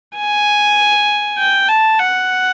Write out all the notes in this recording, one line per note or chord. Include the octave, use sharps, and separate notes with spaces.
G#5
G5
A5
F#5